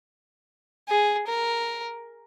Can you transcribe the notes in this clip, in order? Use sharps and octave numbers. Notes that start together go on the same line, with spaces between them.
G#4
A#4